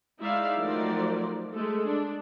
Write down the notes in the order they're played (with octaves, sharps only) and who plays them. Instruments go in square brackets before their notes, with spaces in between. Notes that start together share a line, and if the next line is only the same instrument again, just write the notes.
[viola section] G#3 D#4 E4 D5 E5 F5
D#3 F3 F#3 A3 A#4 D5
G#3 A3 A4
D4